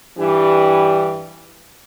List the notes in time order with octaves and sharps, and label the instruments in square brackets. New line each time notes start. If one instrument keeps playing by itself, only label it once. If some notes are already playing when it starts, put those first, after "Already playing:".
[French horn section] G2 E3 G3 D4 G4